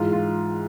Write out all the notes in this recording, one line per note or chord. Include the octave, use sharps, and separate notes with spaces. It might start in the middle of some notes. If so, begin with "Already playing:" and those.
Already playing: G#2 E3 F4
F4